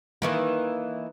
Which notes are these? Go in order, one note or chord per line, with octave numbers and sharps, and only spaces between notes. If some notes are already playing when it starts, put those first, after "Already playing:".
D#3 E3 A#3